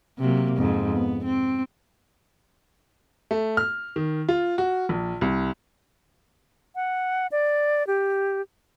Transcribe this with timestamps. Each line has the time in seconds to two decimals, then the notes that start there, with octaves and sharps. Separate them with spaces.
0.19 C3 F#3 A#3
0.57 F2 G#2
0.92 B3
1.24 C4
3.31 A3
3.57 F6
3.96 D#3
4.29 F4
4.58 F#4
4.89 A#1
5.21 C2
6.75 F#5
7.32 D5
7.87 G4